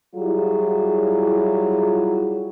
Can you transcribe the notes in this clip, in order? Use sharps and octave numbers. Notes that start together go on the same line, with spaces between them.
F#3 G3 E4 F4 G#4